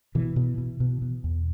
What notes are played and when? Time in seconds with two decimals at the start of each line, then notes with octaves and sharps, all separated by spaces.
0.15 B2 E3
0.36 B2
0.58 B2
0.80 B2
1.02 B2
1.24 E2